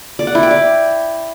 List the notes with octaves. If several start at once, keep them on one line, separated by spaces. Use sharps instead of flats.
D5
F#5
E4
G5
D5